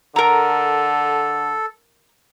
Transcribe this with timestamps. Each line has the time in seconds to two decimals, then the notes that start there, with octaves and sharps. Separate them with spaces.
0.16 D3 A4 A#4 A#5